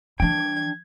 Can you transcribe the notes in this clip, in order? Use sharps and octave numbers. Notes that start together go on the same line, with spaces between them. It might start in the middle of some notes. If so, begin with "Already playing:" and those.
E3 G3 D4 G5 G#6